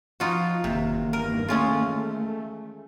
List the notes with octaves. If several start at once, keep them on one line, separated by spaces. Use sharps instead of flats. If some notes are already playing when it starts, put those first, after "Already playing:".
F3 D#4 F4 F#4
F#1 E2 C3 D#3 A#3
G2 A#4
G#3 A3 C#4 F4